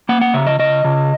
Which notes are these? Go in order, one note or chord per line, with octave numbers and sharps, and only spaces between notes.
A#3 F#5
F#5
C#3 E5
D#5
C#3 D#5
C#3